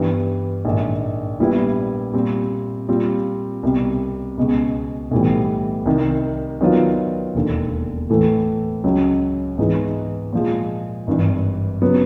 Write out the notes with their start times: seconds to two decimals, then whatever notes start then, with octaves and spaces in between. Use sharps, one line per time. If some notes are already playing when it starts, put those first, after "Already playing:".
Already playing: G2 E3 G3 B3
0.65 A#1 G#2 D#3
1.39 A#1 A#2 G3 B3 E4
2.13 A#2 G3 C4
2.88 A#2 G3 C4 F4
3.63 C2 B2 G3 C4
4.38 C#2 B2 G#3
5.11 B1 A2 E3 G3
5.85 C2 C3 D#3
6.61 D#3 F#3 B3 D4 F4
7.35 E1 D#2 D3
8.10 A2 E3 A3
8.83 C#2 C#3 F#3
9.58 G#2 E3 G#3 B3 D#4
10.33 A#2 F3 G#3
11.07 G#1 G2 E3
11.82 C#3 F#3 B3